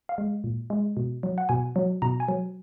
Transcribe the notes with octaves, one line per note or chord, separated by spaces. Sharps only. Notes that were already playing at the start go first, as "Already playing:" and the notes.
F5
G#3
A#2
G#3
B2
F#3
F#5
B2 G#5
F#3
B2 A#5
G#5
F#3